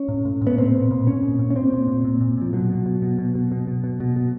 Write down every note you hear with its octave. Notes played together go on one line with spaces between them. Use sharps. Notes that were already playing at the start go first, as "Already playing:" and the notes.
Already playing: C#4
A2
A2
A2
B3
A#2 C4
A#2
A#2
A#2 C#4
A#2
A#2
C#4
A#2 C4
A#2
A#2
A#2
A#2
A#2 F3
B2 F#3
B2
B2
B2
B2
B2
B2
B2
B2
B2
B2